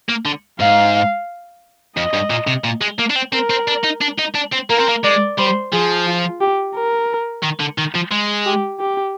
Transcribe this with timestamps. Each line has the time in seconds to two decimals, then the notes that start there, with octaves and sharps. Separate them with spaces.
0.09 A#3
0.25 D3
0.59 G#2 F5
1.96 F2 D#5
2.13 G2
2.30 A#2
2.47 C3
2.64 A#2
2.81 G#3
2.99 A#3
3.10 D4
3.16 C4
3.33 C4 A#4
3.50 C4
3.68 D4
3.84 D#4
4.02 D4
4.19 D#4
4.35 D4
4.53 C4
4.70 A#3 A#4
4.79 C4
4.89 A#3
5.04 G#3 D5
5.38 G3 C5
5.73 F3 G#4
6.07 F4
6.41 G4
6.75 A#4
7.43 D#3
7.60 D3
7.78 D#3
7.95 F3
8.11 G#3
8.46 G4
8.80 G4